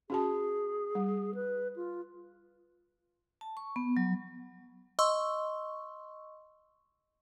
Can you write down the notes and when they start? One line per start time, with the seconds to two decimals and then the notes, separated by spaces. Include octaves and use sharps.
0.10 C#4 F#4 G#4 A5
0.95 G3
1.35 B4
1.76 F4
3.41 A5
3.57 C#6
3.76 B3
3.97 F#3
4.99 D#5 C6 C#6 E6